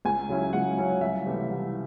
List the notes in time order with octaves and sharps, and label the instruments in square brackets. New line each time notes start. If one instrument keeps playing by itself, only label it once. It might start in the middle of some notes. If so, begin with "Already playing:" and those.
[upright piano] C#2 G#5
C#3 F#3 C#4 E4
C#2 F#5
C#3 F#3 C#4 E4
C2 E5
C3 E3 A3
C2